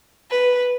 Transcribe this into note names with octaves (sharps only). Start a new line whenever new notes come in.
B4